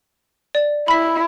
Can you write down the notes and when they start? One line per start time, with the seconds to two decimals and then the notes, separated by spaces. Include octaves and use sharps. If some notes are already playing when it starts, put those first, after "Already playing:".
0.55 D5
0.88 E4 B5 B6